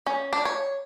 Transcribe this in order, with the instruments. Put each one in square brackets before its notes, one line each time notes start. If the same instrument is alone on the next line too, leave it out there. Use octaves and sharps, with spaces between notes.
[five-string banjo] C#4
D4
C#5